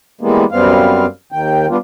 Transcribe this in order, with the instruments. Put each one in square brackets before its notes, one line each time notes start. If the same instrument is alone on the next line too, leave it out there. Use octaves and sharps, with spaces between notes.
[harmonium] E3 G3 G#3 A#3 B3
F#2 G3 B3 C4 F5
D#2 D#3 G5
G3 B3 D4 F4